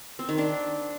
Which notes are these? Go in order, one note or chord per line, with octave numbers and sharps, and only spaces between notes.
C4
D#3
D4